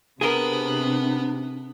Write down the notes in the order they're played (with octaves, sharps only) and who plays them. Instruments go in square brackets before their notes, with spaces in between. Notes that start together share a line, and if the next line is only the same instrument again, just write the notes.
[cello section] C3 [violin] B3 [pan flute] D4 [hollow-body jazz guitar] G#4 A#4